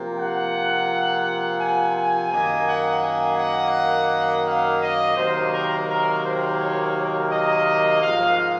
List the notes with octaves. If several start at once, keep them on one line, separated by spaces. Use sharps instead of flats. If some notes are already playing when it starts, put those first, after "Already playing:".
Already playing: C3 F3 A#3
F#5
G#5
G#5
F#2 D#3 A#3 G#5
F#5
G#5
F#5
F5
D#5
C3 D#3 F#3 A#3 C5
A#4
A#4
C5
C#5
D#5
G#2 F3 A#3 F5